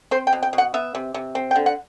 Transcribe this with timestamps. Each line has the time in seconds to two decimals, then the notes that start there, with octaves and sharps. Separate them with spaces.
0.11 C4 C5
0.27 G5
0.33 B2
0.43 G5
0.53 B2
0.58 F#5
0.74 B3 E5
0.95 C3
1.14 C3
1.35 C4
1.51 G5
1.56 D3
1.66 F#5